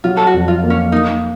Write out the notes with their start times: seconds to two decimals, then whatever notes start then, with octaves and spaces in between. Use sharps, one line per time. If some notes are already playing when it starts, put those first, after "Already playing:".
0.04 F#3 F4
0.17 A4
0.27 F#4
0.34 F2
0.48 F4
0.63 A#3
0.70 C#4
0.92 A#3 D#4